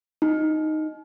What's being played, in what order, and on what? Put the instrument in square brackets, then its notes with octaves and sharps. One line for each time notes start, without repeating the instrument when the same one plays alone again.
[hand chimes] D#4